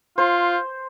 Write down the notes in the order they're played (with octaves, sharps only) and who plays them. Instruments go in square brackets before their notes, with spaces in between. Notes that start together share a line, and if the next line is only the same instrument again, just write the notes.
[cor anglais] F4 [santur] C5